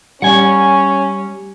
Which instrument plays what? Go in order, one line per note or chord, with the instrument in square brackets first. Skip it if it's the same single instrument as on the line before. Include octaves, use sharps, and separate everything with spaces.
[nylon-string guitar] G3 [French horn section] C#4 [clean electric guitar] F#5 G#5